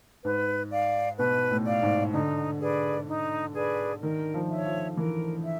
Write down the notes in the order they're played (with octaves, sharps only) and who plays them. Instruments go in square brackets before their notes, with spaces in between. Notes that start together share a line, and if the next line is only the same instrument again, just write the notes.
[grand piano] G#2 [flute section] B4
[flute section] D5 F5
[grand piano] B2 [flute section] B4
[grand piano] A2
[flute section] D5 F5
[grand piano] G#2
[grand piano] D3 [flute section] D#4
[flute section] G#4 B4 D5
D#4
G#4 B4 D5
[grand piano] D#3 [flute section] A#4
[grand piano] F3
[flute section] C#5 E5
[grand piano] F3
[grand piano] E3 [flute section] A#4
[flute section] E5